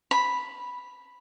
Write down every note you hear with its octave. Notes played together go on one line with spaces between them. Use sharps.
B5